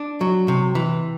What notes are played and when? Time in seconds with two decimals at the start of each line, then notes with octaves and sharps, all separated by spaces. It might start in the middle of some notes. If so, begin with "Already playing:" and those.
Already playing: D4
0.21 F#3
0.48 C3
0.75 E3